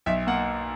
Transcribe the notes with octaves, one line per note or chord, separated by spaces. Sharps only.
B1 E5
A#3 F#5